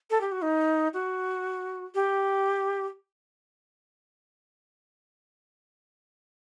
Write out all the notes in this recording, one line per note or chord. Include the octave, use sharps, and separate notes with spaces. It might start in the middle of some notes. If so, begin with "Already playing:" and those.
A4
G4
F#4
D#4
F#4
G4